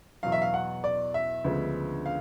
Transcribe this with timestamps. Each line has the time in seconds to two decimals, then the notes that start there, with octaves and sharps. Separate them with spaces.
0.23 E2 B2 F#3 F5
0.32 E5
0.42 F5
0.54 F#5
0.84 D5
1.14 E5
1.44 D2 C#3 F3 G#3 B3
2.06 F5